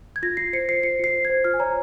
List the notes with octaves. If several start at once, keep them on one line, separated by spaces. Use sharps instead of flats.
G#6
F4 A#6
F4 C7
C5 C#7
C5 C7
F4 C#7
F4 C7
C5
G#6
C5
F4 F6
G#5
C#5 A#5